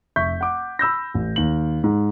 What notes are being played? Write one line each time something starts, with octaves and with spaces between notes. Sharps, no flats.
F1 E5 C#6 G6 B6
F#5 D6
B5 E6 G6 A#6
A1
D#2 F#7
G#2